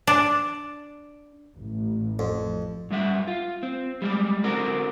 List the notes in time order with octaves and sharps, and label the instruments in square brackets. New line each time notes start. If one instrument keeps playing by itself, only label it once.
[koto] D4
[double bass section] A1
[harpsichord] F2
[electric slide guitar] G2 G3 E5 F#5
F4
C4
G3 G#3 D5
D3 C4 F#4 A#4 D5